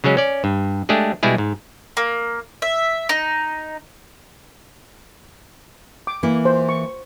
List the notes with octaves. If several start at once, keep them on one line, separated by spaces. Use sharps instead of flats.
C#3 F#3 G#3 C#4
C#4 D5
G2
G#3 A3 D4 G4 G#4
B2 G3 G#3 E4 G#4
G#2
A#3
E5
D#4
D6
E3 A#3 E4
C5
C#6